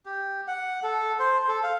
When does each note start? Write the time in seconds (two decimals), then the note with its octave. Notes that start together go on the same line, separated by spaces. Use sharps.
0.06 G4
0.48 F#5
0.83 A4
1.19 C5
1.48 A4
1.63 F5